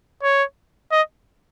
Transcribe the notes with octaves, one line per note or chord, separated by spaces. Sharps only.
C#5
D#5